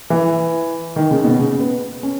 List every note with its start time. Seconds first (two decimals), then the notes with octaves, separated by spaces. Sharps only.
0.10 E3
0.96 D#3
1.11 C#3
1.24 B2
1.39 C#3
1.60 B3
2.03 C#4